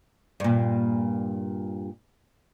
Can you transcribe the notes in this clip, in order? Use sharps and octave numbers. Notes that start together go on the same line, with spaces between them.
G2 A#2